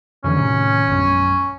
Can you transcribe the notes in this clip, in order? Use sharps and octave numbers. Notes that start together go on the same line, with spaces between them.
F2 D3 E3 C#4
A2 C3 D#3
A#1 F#2